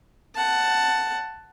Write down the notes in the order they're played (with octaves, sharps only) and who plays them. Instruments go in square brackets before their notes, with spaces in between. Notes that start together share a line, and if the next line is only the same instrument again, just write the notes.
[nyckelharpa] F#5 A5